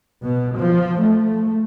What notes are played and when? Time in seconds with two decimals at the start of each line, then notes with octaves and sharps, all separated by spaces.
0.23 B2
0.56 F3
1.00 A3